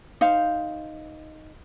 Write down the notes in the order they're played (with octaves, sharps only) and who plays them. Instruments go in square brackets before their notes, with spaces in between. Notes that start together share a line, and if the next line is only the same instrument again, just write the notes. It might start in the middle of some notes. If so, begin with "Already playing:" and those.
[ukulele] D#4 C5 F5